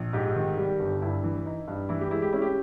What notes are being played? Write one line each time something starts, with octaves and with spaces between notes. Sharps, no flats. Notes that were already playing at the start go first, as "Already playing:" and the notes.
Already playing: A#1
G#2 G4
D#3
G3
G1
G2 E4
E3
D#4
G2
E3 E4
G4
G#3 E4
G4
C#4 E4
G4